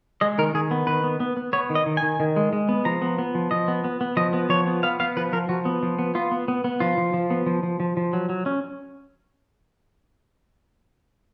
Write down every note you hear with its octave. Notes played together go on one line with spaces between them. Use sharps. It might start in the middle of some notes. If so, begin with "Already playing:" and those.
G#3 D#5
D#3 A#4
D#3 G#4
B3
D#3 B4
B3
B3
B3
B3 C#5
D#3
D#5
D#3
G#5
D#3
D#3
G#3
G#3
B3
F3 A#5
B3
B3
F3
F3 D#5
B3
B3
B3
F3 D#5
B3
F3 C#5
B3
B3 F5
B3 F5
F3 B4
F3 A#4
F3 F#4
B3
F3
B3
B3 F4
B3
B3
B3
F3 F4
F3
F3
B3
F3
F3
F3
F3
F#3
F#3
C#4